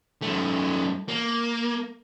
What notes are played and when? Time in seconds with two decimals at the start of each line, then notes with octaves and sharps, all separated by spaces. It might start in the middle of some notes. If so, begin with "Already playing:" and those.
0.22 F#2 A3
1.08 A#3